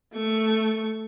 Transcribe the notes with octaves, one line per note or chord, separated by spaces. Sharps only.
A3 C#6